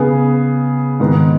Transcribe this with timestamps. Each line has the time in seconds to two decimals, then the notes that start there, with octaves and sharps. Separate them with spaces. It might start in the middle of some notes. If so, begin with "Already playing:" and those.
Already playing: C#3 B3 G#4
1.00 G#2 D#3 B3